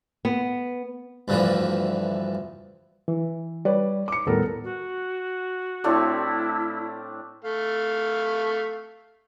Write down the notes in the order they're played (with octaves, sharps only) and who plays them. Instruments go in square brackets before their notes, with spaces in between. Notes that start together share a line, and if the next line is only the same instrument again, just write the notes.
[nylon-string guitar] B3
[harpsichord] D2 G2 D3 E3 F3
[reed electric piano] E3
[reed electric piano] G3 [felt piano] B4 C#5 D5
[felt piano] D6 C#7
[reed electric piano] D#2 A2 G3 [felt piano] B3 A4 A#4
[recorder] F#4
[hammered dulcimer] A2 A3 F4 [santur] C4 D4 [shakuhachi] E4
[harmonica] A3 F5